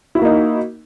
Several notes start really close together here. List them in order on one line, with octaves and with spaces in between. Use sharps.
E4 F#4 A#3 D#4